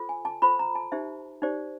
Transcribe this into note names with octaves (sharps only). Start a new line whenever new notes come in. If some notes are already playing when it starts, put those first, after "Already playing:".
Already playing: F4 A4 C5
G#5
A5
F4 A4 C5 B5
A#5
A5
D#4 G4 C5 E5
D#4 G4 C5 D5